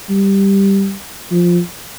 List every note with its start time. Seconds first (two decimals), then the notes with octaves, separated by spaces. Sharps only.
0.10 G3
1.31 F3